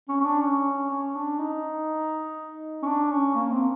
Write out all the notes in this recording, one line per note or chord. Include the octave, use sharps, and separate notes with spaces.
C#4
C#4
D4
C#4
C#4
D4
D#4
C#4
D4
C#4
A#3
C4